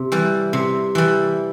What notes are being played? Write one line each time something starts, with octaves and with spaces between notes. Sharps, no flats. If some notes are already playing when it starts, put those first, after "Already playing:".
Already playing: C3
E3 G3
C3
E3 G3